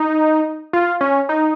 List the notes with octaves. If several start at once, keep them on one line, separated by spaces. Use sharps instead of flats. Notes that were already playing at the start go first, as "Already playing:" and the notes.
Already playing: D#4
F4
C#4
D#4